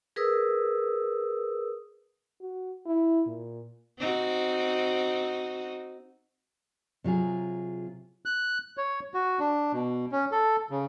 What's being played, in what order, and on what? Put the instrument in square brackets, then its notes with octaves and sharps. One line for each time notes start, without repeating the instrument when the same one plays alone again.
[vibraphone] G#4 A#4 B4 D#6 E6
[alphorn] F#4
E4
A#2
[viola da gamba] C4 D#4 F#4
[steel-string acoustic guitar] C3 F#3 F4 G#4
[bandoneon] F#6
C#5
F#4
D4
B2
C#4
A4
C#3